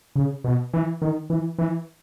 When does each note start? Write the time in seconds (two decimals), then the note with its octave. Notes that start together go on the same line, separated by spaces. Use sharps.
0.15 C#3
0.44 B2
0.73 E3
1.02 D#3
1.30 E3
1.58 E3